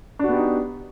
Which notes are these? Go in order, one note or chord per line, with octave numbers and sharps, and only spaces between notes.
B3 D4 D#4 F#4 G4